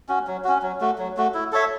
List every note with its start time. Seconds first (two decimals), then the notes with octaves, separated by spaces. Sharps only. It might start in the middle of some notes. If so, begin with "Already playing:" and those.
0.09 C#4 F#4
0.27 F#3
0.44 C#4 F#4
0.62 F#3
0.81 A3 F#4
0.98 F#3
1.17 A3 F#4
1.34 E4
1.52 A4 C#5 E5